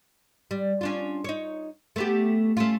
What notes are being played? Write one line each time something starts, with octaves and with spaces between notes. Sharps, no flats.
G3
C#4 D4 F4
D#4 C#5
A3 B3 G4
A3 C#4 F4